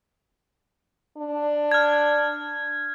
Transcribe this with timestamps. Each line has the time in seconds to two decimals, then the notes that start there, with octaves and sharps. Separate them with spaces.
1.18 D4
1.72 F6 G#6